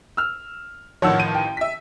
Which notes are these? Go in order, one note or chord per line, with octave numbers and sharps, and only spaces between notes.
E6 F6
A1 D#3 F3 C#5 F#5 E6
D#7
G5
E5 B6